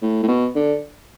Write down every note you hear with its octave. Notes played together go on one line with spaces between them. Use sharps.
A2
A2
B2
D3